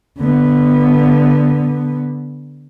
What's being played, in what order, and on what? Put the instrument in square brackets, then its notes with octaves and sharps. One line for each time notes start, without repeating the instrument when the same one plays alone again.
[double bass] D3 B3